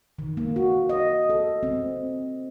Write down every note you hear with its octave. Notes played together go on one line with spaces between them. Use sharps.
D#3
A#3
F#4
D#5
A4
C4